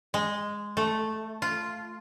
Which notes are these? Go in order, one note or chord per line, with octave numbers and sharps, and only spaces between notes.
G#3
A3
F4